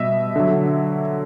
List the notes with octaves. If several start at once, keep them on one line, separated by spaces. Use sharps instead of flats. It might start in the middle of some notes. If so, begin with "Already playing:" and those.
Already playing: B2 G3 D#5 E5
D3 F#3